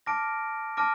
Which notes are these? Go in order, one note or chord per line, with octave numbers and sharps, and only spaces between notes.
A5 D6 F6 A#6 D7
A5 D6 F6 A#6 D7